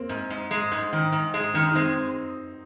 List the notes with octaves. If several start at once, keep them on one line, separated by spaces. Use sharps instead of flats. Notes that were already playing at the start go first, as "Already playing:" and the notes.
Already playing: A#3 C4
G#2
G#2
G#3
G#2
D#3
G#2
G#3
D#3 D#4
D#4
G#3 C4